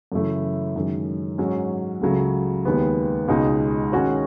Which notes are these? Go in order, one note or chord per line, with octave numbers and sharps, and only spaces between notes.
F#2 C#3 E3 A3 E4
F#2 D#3 G#3
G#2 F#3 C#4
C#2 C#3 F#3 A3
D#2 D#3 G#3 B3
C#2 B2 G#3 D#4
D#3 G#3 C#4 F#4 C#5